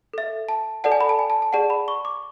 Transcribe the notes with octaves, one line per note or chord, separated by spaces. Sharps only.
A4 E5
A5
A4 D5 F#5 A5
G#5
B5
A5
G#5
A5
A5
G#4 D5 F#5 A5
B5
C#6
D6